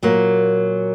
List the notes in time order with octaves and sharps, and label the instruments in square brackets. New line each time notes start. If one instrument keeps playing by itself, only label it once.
[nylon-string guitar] A#2 F#3 A#3